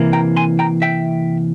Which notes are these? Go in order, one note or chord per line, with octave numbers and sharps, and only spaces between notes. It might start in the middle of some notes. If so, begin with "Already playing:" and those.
Already playing: C3 E3 A#3
G5 A#5
G#5 C6
G5 A#5
E5 G5